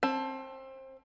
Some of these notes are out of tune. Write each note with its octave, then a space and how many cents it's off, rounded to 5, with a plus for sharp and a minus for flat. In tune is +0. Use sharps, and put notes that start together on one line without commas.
C4 +25 A5 +0